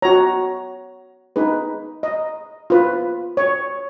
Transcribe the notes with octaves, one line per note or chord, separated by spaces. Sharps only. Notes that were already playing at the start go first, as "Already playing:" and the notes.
F#4 C#5 A#5
D#4 G#4 B4
D#5
F4 B4
C#5